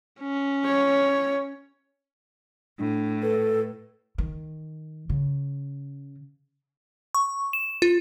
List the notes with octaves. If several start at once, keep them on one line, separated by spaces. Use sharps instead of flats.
C#4
C#5
A2 D4
A4 B4
D#3
C#3
C#6
E7
F4